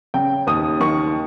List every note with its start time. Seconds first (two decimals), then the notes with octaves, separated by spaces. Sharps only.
0.14 C#3 G5
0.47 D#2 D#6
0.80 D#3 C#6